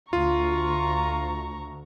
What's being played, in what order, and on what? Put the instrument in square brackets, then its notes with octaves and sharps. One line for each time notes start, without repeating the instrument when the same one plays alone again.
[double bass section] D2 [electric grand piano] F4 [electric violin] A#5 C#6